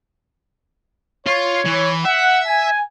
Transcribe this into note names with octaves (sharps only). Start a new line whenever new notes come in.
F4 C#5
E3
E5 F#5
G#5